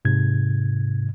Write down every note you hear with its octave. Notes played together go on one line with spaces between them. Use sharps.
G#2 C3 G#6